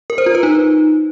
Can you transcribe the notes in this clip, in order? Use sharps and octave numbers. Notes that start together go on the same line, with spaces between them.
A#4
C5
F4
B4
D#4